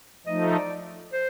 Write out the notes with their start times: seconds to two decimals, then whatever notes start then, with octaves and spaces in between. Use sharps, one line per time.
0.26 F3 A3 D#4 D#5
0.55 D5
1.13 C5